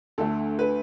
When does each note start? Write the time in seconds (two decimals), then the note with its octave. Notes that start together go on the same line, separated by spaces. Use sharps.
0.18 D2 D3 A3 A4
0.59 B4